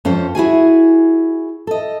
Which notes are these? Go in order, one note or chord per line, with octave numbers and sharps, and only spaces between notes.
F2 C#4 A4 C5
E4 F#4 G#4 G#5
A4 D#5